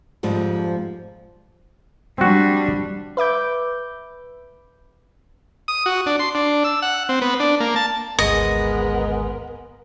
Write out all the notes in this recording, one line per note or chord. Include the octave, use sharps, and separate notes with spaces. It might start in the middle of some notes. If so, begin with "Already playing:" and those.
F2 G#2 F3 G3
G3 C4 D4 F#4
B4 E5 D6 G6
D#6
F#4
D4
C6
D4
E6
F#5
C4
B3
D4
A#3
A5
G#1 D2 G#3 B3 A#4 D#5